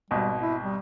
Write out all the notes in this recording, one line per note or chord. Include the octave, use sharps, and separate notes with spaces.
G#1 B2 G3
E4
G3